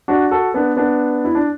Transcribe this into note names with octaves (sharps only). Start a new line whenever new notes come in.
D4 F#4
F#4 A4
B3 D4
B3 D4
E4
D4